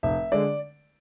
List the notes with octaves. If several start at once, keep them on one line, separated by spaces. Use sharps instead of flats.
F1 E5
D3 G#3 D5